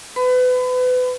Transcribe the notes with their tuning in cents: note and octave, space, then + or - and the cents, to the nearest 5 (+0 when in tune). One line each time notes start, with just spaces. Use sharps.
B4 +30 B5 +35